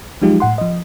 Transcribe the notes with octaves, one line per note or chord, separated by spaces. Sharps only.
F3 F#3 G#3 D#4 F4 G4
A2 F#5 C6
F3 D#5